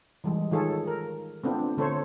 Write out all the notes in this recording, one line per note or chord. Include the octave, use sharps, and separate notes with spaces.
E3 G3 G#3
D#3 F4 G#4 A4 C#5
A#4
A3 B3 C4 D4 F4
D3 A3 A4 C5 C#5